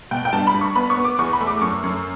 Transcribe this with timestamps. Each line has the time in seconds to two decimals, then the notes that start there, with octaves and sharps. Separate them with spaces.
0.11 B2 G5
0.25 G5
0.33 G2 A5
0.47 B5
0.54 G2
0.61 C#6
0.75 B3 B5
0.90 C#6
0.97 B3
1.04 D6
1.18 E2 C#6
1.33 B5
1.40 A3
1.47 D6
1.61 F#2 C#6
1.83 F#2